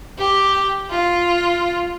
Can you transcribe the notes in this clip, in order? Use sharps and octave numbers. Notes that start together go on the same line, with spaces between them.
G4
F4